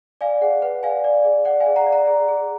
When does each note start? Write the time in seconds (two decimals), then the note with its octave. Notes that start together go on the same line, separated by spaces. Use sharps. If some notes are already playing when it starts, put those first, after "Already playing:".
0.21 D5 F5 G#5
0.41 G#4 F#5
0.62 B4 F#5
0.83 D5 F5 G#5
1.04 D5
1.24 G#4
1.45 D5 F#5
1.60 F5 G#5
1.67 G#4
1.76 F#5 A#5
1.87 D5
1.92 F#5 A#5
2.07 G#4
2.28 G#4